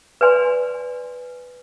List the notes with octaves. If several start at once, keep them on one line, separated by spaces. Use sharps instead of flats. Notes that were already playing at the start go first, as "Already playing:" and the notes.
B4 D5 G#5 C6